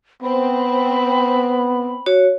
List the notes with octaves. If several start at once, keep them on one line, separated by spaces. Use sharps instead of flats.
B3 C4 B5
F#4 C#5